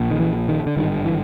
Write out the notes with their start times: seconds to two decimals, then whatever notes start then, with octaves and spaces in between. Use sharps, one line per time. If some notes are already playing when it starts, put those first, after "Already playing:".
Already playing: A#1 A#2
0.11 D#3
0.20 E3
0.48 D#3
0.66 D3
0.76 G#1 G2 D3 D#3
1.05 E3